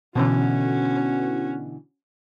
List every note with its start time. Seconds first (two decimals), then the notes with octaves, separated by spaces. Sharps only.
0.15 B2 D3 E3 C#4 F#4